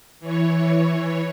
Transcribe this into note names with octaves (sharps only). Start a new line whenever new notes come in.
E3 C#5